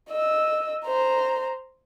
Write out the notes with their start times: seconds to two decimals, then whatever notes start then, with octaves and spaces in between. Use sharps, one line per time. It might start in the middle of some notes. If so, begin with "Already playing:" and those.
0.10 D#5 E6
0.85 C5 A#5